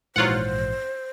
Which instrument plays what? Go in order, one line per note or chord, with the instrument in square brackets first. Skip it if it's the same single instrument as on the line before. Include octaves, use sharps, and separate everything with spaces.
[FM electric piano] A#1 G#2 E3 [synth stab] F#3 F4 F#5 [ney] C5